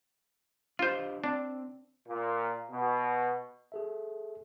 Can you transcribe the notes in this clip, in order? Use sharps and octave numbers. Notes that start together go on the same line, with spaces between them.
D4 F4 G4 C5 D#5
C4 D4
A#2
B2
G#4 A4 E5